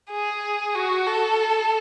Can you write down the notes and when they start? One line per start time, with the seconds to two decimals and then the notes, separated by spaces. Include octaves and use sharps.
0.11 G#4
0.75 F#4
1.07 A4